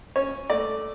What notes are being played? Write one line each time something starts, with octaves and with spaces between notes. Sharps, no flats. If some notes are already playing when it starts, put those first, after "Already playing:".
C#4 C#5
A3 D5